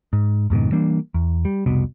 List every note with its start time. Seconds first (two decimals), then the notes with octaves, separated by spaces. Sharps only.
0.13 G#2
0.50 F2 G#2 B2 D#3
0.72 E3 G3 A#3 D4
1.14 E2
1.45 G3
1.66 F1 C2 B2